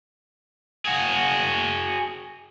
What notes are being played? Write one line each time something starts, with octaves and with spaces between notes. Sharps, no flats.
F#4 G#4